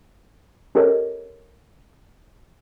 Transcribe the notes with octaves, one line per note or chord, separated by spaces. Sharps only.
C#4 G4 A4 A#4 C#5 D#5